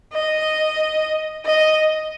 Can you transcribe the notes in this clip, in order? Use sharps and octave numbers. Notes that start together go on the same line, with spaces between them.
D#5
D#5